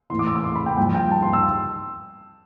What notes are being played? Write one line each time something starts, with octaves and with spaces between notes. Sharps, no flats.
A2 E3 C6
D6
E6
D6
C6
B5
G5
G2 F3 G5
G5
A5
C6
E6